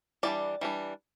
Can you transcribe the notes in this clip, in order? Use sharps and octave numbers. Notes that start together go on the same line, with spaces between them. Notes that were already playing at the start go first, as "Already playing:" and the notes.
E3 G3 D4 D5
E3 G3 D4